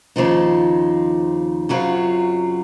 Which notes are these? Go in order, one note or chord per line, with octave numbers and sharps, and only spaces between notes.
D#2 C#3 F3 C4 D#4
F#2 C#3 F#3 C4 F4